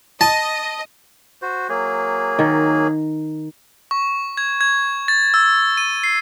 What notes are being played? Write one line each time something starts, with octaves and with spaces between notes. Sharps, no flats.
D#5 A5
F#4 C5
F#3 A#3 G#4
D#3
C#6
G#6
G#6
A6
E6
D#7
C7